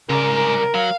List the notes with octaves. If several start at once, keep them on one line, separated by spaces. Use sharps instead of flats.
C2 G#2 C#3 A#4 D5
F#3 F5